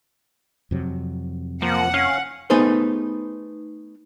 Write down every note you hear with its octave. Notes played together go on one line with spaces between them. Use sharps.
F2 C3 F#3
F3 A#3 F#5
C#4 F5
A3 B3 D#4 G#4 B4 C5